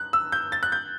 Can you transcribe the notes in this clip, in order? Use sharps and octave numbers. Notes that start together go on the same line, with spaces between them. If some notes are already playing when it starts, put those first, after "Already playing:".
Already playing: F#6
E6
G6
A6
F#6
G6